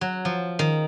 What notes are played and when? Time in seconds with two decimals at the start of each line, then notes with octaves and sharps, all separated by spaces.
0.01 F#3
0.25 F3
0.59 D#3